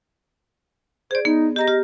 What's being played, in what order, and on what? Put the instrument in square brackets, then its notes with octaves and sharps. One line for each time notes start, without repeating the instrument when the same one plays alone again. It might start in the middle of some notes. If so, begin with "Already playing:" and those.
[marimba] G#4 D5 [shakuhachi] C5
[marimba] B3 [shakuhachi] D#4
[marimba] G4 A#5 A#6 [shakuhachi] D#5
[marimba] G4 F6